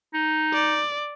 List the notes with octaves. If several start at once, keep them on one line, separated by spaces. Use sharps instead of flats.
D#4
D5